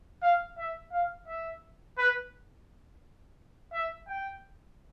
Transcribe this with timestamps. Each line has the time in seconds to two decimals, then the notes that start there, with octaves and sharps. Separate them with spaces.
0.22 F5
0.58 E5
0.92 F5
1.27 E5
1.98 B4
3.73 E5
4.08 G5